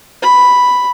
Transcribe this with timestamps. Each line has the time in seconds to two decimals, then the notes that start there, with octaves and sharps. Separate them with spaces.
0.22 B5